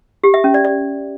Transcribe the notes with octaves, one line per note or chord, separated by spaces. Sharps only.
G4
E5
C#4
D5
D5